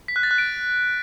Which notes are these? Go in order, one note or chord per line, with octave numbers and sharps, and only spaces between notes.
B6
F#6
A6
F#6
D7